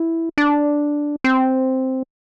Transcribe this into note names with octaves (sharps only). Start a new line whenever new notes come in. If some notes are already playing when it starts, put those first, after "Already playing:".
Already playing: E4
D4
C4